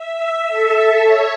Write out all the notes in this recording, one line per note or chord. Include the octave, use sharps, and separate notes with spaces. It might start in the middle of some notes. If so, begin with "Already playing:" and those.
Already playing: E5
A4
C#5